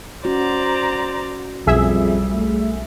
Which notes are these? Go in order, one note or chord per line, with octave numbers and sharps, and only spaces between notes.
C#4 F#4 C5 D5 A#5
B1 F2 G3 G#4 E5
A3